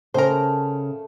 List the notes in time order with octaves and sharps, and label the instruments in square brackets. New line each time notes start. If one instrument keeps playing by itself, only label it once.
[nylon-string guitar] C#3 G5 G#5 [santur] A3 [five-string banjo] A#4 C5